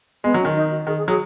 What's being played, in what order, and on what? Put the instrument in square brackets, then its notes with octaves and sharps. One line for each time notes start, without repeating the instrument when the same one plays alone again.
[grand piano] G#3 [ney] B3
[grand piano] F#3
[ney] C#4
[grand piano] D#3
[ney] D#4
F#4
[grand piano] D#3 [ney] G#4
[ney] G#4
[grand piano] F#3 [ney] G#4